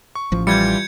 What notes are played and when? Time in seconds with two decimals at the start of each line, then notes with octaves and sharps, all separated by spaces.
0.15 C#6
0.32 A1 F3
0.47 E3 G3 F4 G4 G6 G#6 C#7